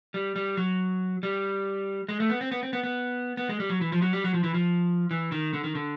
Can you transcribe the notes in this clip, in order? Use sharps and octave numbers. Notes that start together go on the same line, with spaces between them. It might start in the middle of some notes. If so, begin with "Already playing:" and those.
G3
G3
F#3
G3
G#3
A3
B3
C4
B3
C4
B3
B3
B3
G#3
G3
F#3
E3
F3
F#3
G3
F#3
F3
E3
F3
E3
D#3
D3
D#3
D3